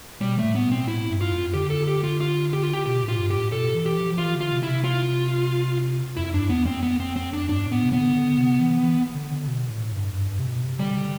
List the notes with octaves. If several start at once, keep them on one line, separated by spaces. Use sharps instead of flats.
B2 G3
A2 A3
B3
B2
C4
A2 E4
G2
F4
F2
D3 G4
A4
G4
F4
F4
G4
F4
G4
B2 G4
A2
F4
G2
G4
A2
B2 A4
E3
G4
F3
F3
E3 F4
D3
F4
C3
E4
C3
F4
F2 E4
G2 D4
E2 B3
F2 C4
B3
C4
C4
D4
G2 D4
A2
B3
C3
B3
D3
D3
C3
E3
E3
D3
D3
B2
A2
G2
G2
G2
C3
B2
C3
D3 G3
C3
D3